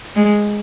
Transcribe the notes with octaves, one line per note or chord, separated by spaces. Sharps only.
G#3